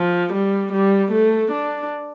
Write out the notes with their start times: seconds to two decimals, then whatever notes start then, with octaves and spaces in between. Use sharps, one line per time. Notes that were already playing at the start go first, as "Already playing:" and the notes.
Already playing: F3
0.33 G3
0.73 G3
1.12 A3
1.52 D4